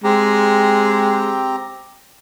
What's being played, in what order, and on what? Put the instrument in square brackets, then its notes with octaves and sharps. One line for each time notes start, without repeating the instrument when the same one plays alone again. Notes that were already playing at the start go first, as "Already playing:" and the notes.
[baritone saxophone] G#3 [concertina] C4 G4 A#5